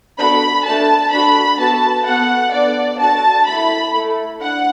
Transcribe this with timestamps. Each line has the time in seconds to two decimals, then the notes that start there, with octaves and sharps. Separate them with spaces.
0.18 B3 D4 F#4 A4 B5
0.65 A3 D4 A4 A5
1.12 D4 F#4 A4 B5
1.59 B3 F#4 A4 A5
2.06 B3 F#4 A4 F#5
2.53 B3 D4 A4 D5
3.00 D4 F#4 A4 A5
3.47 A3 E4 A4 B5
3.94 A3 E4 A4
4.42 D4 F#5